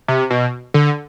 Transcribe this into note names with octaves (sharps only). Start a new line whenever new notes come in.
C3
B2
D3